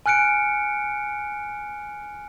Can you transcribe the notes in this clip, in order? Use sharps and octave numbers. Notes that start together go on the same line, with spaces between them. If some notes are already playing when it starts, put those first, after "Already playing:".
G#5 F6 F#6 C#7 D7